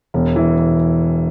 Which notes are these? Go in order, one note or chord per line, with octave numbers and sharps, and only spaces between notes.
E1
E3